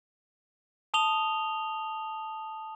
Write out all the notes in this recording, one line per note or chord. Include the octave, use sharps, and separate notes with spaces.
A5 D#6 F7 G7